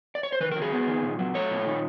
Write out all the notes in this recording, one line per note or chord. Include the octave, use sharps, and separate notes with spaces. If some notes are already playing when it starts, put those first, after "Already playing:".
D5
C#5
C5
D#3 B4
A#4
F#3
G#4
B3
D#3
A#2
F#3
A3 C#5
A#2
D#3